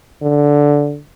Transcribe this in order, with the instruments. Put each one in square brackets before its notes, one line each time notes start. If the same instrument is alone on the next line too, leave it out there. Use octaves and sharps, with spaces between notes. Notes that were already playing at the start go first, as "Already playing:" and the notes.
[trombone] D3